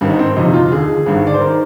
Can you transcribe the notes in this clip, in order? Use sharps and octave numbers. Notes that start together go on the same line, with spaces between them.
G#1 G2 D#3
D#4
C4
G1 F2 C3 D#4
F4
D#2 D3 G#4
G#1 G2 D3
D5
C5
D#3 A#4